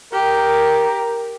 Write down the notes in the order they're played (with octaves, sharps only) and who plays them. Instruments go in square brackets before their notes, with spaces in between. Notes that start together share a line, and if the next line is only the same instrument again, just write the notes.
[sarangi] G4 [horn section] A#4